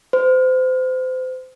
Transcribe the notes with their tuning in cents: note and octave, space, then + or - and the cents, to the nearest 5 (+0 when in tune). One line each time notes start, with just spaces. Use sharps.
C5 -30